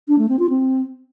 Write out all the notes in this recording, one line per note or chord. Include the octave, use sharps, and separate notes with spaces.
D4
A3
C4
F4
C4